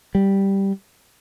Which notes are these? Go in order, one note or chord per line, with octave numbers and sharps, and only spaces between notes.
G3